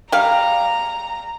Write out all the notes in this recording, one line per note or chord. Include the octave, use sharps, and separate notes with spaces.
G3 F5 A#5